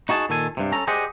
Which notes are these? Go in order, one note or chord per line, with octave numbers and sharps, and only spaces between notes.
D#4 F#4 G#4 A5
A#2 D#3 A4 G#5
G2 C3
C#4 A4 A#5
G4 G#4 C5 D5 D#5 F#5